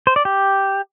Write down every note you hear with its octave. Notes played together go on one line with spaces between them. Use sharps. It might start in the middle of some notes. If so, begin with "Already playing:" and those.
C5
D5
G4